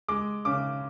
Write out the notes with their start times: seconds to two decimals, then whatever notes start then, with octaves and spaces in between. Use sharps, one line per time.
0.08 G#3 D6
0.45 C#3 D6